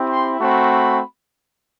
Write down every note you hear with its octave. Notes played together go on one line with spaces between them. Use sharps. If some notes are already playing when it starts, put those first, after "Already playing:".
Already playing: C4 E4 G4
C6
A3 C4 F#4 B5